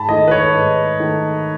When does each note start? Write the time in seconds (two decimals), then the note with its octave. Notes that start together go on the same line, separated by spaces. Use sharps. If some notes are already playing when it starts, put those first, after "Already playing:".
Already playing: G#2 A5 B5
0.09 D#3 A3 D#5
0.28 B4
0.31 C#5
0.55 G#2
1.00 D#3 A3